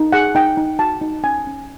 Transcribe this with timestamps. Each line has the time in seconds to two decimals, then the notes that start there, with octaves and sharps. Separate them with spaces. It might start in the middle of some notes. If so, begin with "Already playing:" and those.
Already playing: D#4
0.12 G#4 F#5
0.35 D#4 G5
0.57 D#4
0.79 F#4 A5
1.01 D#4
1.24 C#4 G#5
1.47 C#4